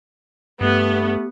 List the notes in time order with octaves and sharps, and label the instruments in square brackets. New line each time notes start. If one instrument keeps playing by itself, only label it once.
[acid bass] G2 [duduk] A3 [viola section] B3 [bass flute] G4